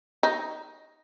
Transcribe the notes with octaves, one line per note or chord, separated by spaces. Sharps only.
D#4